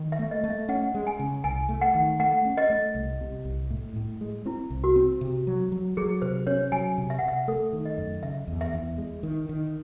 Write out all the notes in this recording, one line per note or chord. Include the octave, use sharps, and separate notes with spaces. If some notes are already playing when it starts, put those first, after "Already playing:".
Already playing: D#3
E5
A3
D#5
A3
E5
C#4 F#5
G#3
G#5
C#3
C2 G#5
A3
F#5
D#3
A3 F#5
C#4
D#5
A3
C2
C3
C2
A2
A2
G#3
C4 E4
C2
F#4
C4
C3
F#3
F#3
F#3 G#4
C3 C5
C#4 C#5
F#3 G#5
C3
E5
F#5
C3
E5
A3 A4
D#3
D#5
F#2
C#3 E5
E2
E5
E2
G#3
D#3
D#3